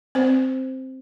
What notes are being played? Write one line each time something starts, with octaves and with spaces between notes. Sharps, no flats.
C4 C5